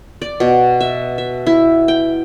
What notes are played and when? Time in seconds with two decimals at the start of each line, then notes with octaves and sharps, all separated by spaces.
0.22 D5
0.40 B2
0.81 E5
1.18 E5
1.47 E4
1.88 G5